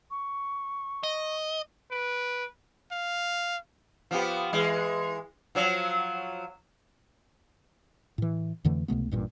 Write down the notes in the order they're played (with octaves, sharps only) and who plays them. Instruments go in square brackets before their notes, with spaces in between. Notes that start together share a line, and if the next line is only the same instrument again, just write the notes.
[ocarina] C#6
[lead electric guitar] D#5
[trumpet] B4 [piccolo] D7
[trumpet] F5
[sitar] F3 B3 G4
E3 G#3
F3 F#3
[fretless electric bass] A2 E3
F2 D3 E3 A3
C#2 C3 A3 B3
A1 G2 A#2